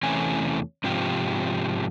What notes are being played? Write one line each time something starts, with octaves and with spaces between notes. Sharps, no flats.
E2 C3 E3 A3 C#4 G#5
G#2 C3 F3 G4